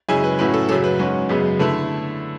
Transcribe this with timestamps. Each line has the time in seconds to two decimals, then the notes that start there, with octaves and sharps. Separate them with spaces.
0.09 F#2 C#3 G#3 C#4 E4 E5 G#5
0.24 B4
0.39 A2 F#3 C#4 E4 B4
0.54 A4
0.69 F#2 C#3 F#3 A4
0.84 B4
0.99 G#2 F#3 C#4
1.29 F#2 C#3 G#3 B3
1.59 D3 A3 E4 B4